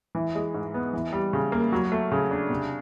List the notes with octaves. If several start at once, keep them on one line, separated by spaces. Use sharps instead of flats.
E3
G#3
G#2
B3
E3
G3
C#3
A#3
F#3
A3
C#3
D4
C3